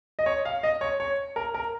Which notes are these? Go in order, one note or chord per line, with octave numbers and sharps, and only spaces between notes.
D#5
C#5
F5
D#5
C#5
C#5
A#4
A#4